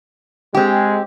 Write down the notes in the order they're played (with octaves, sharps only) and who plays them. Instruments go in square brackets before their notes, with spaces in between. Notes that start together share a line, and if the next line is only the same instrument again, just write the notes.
[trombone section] G#3 [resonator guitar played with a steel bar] C4 G4